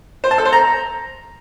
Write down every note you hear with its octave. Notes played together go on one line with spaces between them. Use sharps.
C5
A5
A4
C5
A#5